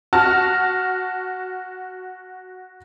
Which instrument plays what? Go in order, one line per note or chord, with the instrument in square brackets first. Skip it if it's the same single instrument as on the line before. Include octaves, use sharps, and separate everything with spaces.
[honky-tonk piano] F#4 A5 F6